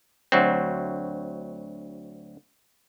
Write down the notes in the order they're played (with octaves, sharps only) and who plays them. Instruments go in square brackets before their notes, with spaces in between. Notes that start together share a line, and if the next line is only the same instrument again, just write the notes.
[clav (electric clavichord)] D2 F#3 C4